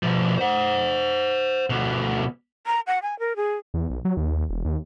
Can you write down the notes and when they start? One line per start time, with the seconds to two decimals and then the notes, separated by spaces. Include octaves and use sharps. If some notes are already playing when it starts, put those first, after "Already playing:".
0.03 B2 F3
0.38 C5 F#5
1.70 D2 B2
2.66 A#5
2.87 F#5
3.02 G#5
3.19 A#4
3.36 G#4
3.74 E2
3.90 B1
4.05 F#3
4.17 D#2
4.50 E1
4.65 D#2